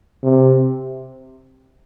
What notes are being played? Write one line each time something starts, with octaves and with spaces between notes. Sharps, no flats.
C3